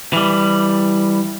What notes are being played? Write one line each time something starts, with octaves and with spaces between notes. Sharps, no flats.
E3 G3